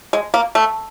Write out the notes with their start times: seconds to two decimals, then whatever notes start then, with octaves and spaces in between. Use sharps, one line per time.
0.13 G#3
0.34 A#3
0.55 A3